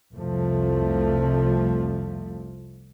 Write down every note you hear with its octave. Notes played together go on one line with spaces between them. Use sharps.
C2 F2 C3 F3 A3